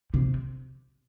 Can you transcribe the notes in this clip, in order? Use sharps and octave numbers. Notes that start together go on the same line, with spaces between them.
C3